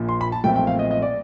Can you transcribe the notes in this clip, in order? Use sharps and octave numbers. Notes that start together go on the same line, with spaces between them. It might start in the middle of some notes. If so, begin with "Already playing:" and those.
Already playing: A#1 A#2 F3
C6
B5
A5
B1 A#2 F3 A3 C4 G5
G5
F5
D#5
D#5
D5